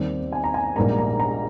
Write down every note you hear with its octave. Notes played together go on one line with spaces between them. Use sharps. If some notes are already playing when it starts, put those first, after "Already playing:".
Already playing: D#2 D#3 G3 C4 D5
G#5
A#5
G#5
A#1 G#2 G3 A#3 A#5
A#5
A#5